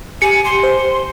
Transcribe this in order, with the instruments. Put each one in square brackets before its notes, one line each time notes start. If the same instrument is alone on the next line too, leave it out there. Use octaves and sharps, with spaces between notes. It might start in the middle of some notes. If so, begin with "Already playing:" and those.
[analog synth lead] G4 [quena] G#5 [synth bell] C#7
[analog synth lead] G4 [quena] C6
[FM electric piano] C5